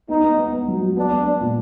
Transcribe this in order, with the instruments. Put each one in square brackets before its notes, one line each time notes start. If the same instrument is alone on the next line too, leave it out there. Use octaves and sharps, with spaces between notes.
[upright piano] B3 [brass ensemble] D#4
[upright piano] B3
B3
B3
F#3
F#3
[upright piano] B3 [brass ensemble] D4
[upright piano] B3
B3
A#2